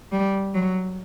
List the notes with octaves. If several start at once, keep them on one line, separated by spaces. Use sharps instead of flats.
G3
F#3